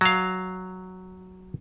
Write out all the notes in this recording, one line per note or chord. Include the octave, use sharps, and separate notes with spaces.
F#3 F5